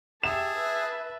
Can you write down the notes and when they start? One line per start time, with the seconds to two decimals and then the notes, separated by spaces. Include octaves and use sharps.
0.23 G4 G#4 E5 A5 E7
0.53 B4 E5